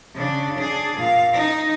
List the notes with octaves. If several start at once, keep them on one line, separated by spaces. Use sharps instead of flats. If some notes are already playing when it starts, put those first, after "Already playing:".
C#3 D4
D4 G#4
A#2 F5
D#4